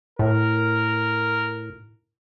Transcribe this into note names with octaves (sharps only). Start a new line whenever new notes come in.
A2 A#4